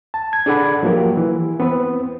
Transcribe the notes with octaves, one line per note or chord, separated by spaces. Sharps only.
A5
G#6
D4 G#4 A4 D5 F#5 B5
F3 F#3 A#3 G4 A#4
E3
B3 C4 B4